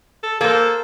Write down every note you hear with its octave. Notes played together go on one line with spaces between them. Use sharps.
A4
A#3 A4 A#4 C5